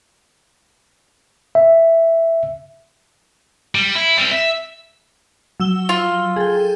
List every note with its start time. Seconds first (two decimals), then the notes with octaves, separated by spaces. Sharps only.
1.55 E5
3.75 G3
3.95 E4
4.18 G3 C4
4.31 E5
5.60 F#3 E6 G7
5.89 F4
6.36 G#4 A4 G5